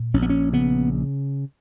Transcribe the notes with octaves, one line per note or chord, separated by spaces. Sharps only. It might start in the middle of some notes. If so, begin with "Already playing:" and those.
Already playing: A#2
A#1 C#4
B3
C#4
C#3 B3